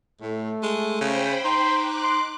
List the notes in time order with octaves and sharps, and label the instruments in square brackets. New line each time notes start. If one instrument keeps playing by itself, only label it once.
[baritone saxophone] A2 [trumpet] A3
[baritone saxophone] G#3
[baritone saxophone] C#3 [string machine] C5 G5 B5
[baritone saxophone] D#4 [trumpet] C6
[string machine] D6 F#6
[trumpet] C6